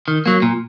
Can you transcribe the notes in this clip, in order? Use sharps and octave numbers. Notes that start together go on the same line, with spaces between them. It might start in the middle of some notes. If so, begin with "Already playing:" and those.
D#3
F#3 A#3
A#2